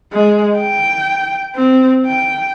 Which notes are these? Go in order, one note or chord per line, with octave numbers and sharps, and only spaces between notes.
G#3
G5
C4
G5